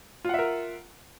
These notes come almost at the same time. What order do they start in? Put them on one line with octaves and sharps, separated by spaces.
F4 F#5 E5 A#4